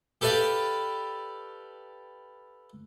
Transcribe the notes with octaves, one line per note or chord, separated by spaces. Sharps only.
G4 A4 B4 D5 F5 G5